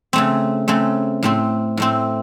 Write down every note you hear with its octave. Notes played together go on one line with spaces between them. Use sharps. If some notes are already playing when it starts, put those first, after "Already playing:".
C#3 A3 C4
C#3 A3 C4
A2 A3 C4
A2 A3 C4